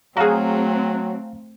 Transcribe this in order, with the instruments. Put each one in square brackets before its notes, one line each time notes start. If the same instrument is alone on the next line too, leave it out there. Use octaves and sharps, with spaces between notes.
[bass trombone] F#3 [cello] A3 C4 [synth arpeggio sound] F#4 G#4 [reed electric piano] F5 A#5